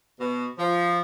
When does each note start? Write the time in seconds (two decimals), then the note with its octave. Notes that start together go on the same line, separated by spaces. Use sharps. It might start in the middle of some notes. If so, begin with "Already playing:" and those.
0.20 B2
0.59 F3